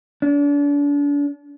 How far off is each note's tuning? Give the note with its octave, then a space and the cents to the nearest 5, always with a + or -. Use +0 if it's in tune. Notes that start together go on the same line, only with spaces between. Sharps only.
D4 -35